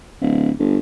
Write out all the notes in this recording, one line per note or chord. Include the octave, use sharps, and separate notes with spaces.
D1
G1